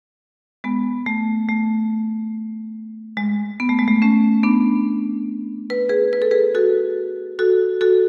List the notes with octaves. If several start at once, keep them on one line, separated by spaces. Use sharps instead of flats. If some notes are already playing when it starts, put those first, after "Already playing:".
G#3 B3
A3
A3
G#3
B3
A3
G#3
A3
A3 C#4
B3 D4
B4
G#4 B4
B4
A4
G#4 B4
F#4 A4
F#4 A4
F#4 A4